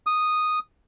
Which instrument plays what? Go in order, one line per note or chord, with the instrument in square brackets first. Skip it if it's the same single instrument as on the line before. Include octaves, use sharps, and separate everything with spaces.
[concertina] D#6